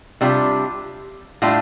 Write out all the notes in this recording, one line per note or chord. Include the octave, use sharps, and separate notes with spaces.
C3 G3 D4 F4
A2 G3 D4 F4